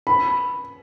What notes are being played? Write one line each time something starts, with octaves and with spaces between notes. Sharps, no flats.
B5